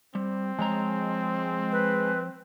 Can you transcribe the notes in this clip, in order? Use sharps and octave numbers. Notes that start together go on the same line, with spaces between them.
G3 C4
F3 G#3 C#5 A#5
B4